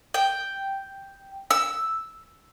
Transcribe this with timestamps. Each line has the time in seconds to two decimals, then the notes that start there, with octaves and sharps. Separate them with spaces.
0.14 G5
1.51 E6